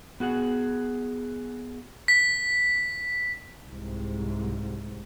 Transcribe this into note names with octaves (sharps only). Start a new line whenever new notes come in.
B3 F#4 G#4 F#5
B6
C2 G#2